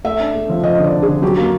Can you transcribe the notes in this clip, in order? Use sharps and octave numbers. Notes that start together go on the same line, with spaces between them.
A3 E5
D4
A3
F3
F3 D#5
D3
D5
D4
G#4
D3
F#3 G4
A#3